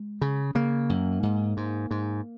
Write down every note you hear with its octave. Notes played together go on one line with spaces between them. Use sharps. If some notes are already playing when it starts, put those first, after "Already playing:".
Already playing: G#3
C#3
C#3 A#3
F#2
G#2
G#2
G#2